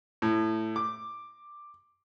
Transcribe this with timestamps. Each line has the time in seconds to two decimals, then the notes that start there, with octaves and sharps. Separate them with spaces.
0.22 A2
0.76 D6